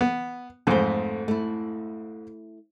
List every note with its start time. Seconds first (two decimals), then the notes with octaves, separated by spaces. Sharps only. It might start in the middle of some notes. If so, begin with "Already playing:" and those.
0.01 B3
0.67 F2 G#2 A3 C5
1.28 A3 E4